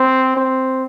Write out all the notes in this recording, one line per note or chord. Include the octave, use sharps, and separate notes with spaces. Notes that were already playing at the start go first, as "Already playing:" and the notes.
Already playing: C4
C4